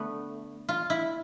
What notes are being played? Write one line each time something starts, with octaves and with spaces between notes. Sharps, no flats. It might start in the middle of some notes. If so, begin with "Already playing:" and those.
Already playing: D3 A3 B3
F4
E4